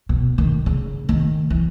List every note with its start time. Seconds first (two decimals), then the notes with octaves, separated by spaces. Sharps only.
0.09 B2
0.38 D#3
0.66 C#3
1.09 D#3
1.50 E3